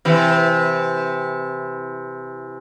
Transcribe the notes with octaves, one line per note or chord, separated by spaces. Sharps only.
C3 E3